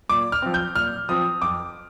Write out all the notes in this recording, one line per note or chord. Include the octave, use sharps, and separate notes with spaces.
A#2 D6
F6
F3 C4
G6
A#2 F6
F3 C4 D#6
F2 D6